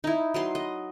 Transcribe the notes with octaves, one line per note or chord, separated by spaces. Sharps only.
D#4 E4
F#3 B4 C6
D#5